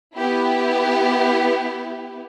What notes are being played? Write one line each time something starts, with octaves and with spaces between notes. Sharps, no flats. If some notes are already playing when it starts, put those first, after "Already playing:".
B3 E4 G4